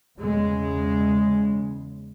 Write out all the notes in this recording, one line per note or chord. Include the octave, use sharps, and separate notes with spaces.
E2 C#3 G#3